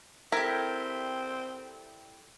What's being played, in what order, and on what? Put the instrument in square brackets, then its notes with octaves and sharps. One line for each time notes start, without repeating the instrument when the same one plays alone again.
[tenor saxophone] C4 [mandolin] E4 G4 [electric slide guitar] A4 D5 E5 [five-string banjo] A#4